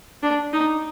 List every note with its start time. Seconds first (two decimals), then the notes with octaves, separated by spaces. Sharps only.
0.23 D4
0.52 D#4